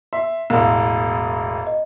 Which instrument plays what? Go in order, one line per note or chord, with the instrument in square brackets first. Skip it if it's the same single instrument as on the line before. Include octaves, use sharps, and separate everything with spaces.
[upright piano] E5 C6
[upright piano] E1 A1 [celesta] A#4 F5
[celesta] D#5